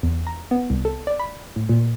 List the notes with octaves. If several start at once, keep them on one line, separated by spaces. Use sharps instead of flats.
E2
A#5
B3
C2
A4
D5
B5
A2
A#2